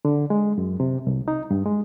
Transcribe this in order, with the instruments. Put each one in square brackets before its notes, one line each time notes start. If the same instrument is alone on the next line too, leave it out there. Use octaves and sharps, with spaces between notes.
[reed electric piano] D3
G#3
F#2
C3
C2
D#4
G2
G#3